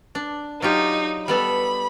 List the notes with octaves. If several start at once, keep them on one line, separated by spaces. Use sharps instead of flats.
D4
F#3 D#4 F4 G4
G3 B3 A4 B5